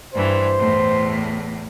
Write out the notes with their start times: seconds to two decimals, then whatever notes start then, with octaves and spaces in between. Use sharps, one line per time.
0.14 G2 E3 C5
0.59 E2 A2